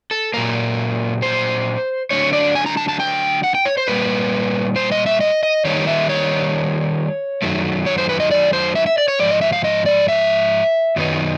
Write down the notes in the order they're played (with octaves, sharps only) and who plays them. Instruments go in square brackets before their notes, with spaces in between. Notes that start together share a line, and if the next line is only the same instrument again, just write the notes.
[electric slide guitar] A4
A#2 F#3 A#3 A#4
C5
D3 F#3 A3 D4 C#5
D5
G#5
A#5
A5
A5
G5
F#5
G5
C#5
C5
A#2 G3 A#3 B4
C5
D#5
E5
D#5
D#5
D#3 G3 A#3 D#4 C#5
E5
C#5
F#2 D#3 F#3 A3
C#5
C5
B4
D#5
D5
C5
E5
E5
D5
C#5
G#2 F3 D5
D#5
E5
F5
D#5
D5
E5
F#2 D#3 F#3 B3 D#4